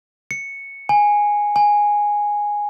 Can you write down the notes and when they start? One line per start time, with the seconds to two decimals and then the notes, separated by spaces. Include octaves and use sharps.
0.31 C#7
0.89 G#5
1.56 G#5